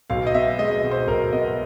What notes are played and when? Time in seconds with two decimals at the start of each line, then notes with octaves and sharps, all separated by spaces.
0.10 B1 F5
0.27 D#5
0.34 B3 E5
0.59 G#3 D#5
0.84 B2
0.91 C5
1.08 B1 A#4
1.33 B3 D#5